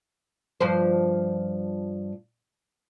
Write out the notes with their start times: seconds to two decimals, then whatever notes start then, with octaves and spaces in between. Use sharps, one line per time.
0.60 G2 F3 C5